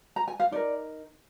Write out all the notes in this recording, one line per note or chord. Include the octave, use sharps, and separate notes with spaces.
A#5
G#5
F5
D#4 A#4 D5